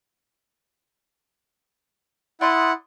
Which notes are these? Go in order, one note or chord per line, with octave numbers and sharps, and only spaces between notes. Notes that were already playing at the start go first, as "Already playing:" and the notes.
E4 D5 F#5 C6 D#6